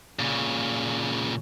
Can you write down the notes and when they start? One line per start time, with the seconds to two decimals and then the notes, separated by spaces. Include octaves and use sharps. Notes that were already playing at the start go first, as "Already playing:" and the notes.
0.19 A#2 C#3